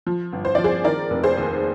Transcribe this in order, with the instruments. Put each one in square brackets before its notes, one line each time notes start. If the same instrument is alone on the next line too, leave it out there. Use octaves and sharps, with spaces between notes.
[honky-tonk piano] F3
G1
C5
F3 D5
G#4 C5
D#3 A#4 D5
F1
G#4 C5
D#2